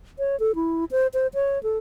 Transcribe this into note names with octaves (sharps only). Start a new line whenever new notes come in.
C#5
A4
E4
C5
C5
C#5
A4